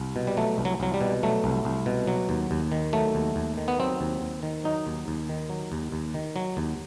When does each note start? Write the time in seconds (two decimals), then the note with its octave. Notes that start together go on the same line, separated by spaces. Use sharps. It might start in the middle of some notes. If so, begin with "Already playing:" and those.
Already playing: C2
0.16 B2
0.27 G3
0.37 F#3 A3
0.58 C2
0.65 F#3
0.80 C2 F#3
0.94 G3
1.01 B2
1.23 F#3 A3
1.44 C2
1.65 C2
1.86 B2
2.07 F#3
2.29 D#2
2.51 D#2
2.72 D#3
2.93 F#3 A3
3.15 D#2
3.36 D#2
3.58 D#3
3.68 B3
3.80 F#3 C4
4.01 D#2
4.21 D#2
4.43 D#3
4.64 F#3 D#4
4.87 D#2
5.08 D#2
5.29 D#3
5.50 F#3
5.72 D#2
5.92 D#2
6.14 D#3
6.36 F#3
6.57 D#2